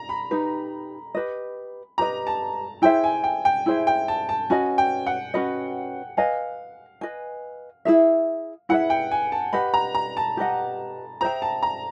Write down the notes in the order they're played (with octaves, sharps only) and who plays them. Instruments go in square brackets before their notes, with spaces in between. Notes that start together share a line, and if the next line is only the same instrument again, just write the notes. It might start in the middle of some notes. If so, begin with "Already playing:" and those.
Already playing: [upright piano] A#5
B5
[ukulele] D#4 G4 B4
G4 B4 D#5
[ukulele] G4 B4 D#5 [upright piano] A#5
[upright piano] A5
[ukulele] E4 G#4 C5 E5 [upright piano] G5
[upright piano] G#5
G5
G5
[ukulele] E4 G#4 C5 E5
[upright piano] G5
A5
A5
[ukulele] C#4 F#4 B4 D#5 [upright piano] G#5
[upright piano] G5
F#5
[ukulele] C#4 F#4 B4 D#5
[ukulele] B4 D#5 G#5 [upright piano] F5
[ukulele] B4 D#5 G#5
E4 G#4 B4 E5
[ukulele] E4 G#4 B4 E5 [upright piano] F#5
[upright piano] G5
G#5
A5
[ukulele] G4 B4 D#5 F#5 [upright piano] B5
[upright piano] A#5
A#5
A5
[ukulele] G4 B4 D#5 F#5
[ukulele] G#4 C5 E5 G5 [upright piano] A#5
[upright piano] A5
A#5